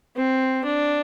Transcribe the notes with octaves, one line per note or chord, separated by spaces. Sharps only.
C4
D4